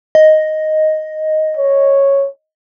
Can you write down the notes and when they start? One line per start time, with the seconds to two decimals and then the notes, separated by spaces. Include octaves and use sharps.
0.15 D#5
1.57 C#5